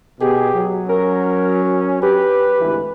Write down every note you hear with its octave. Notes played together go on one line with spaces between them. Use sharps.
B2 G4 G#4
F#3
C#4 A#4
G4 B4
G#1 D2 E3